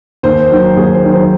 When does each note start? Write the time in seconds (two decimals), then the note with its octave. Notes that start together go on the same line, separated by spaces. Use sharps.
0.23 D#2 C5
0.51 D#3 F#3
0.77 D#2 G#4
0.94 C5
1.04 D#3 F#3
1.12 C5